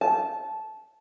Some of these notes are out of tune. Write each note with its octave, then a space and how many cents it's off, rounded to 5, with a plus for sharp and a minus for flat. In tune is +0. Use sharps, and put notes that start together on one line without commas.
A5 -20